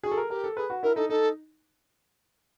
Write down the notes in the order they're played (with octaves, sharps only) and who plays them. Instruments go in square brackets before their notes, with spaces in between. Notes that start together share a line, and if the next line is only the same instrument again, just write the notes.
[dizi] F#4 [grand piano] G#4
[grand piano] A4
A#4
[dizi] G4 [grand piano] A#4
[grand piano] A4
[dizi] G#4 [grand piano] B4
[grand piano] F#4
[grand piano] E4 [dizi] A#4
[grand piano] D#4 [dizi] A4
[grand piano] D#4 [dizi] A4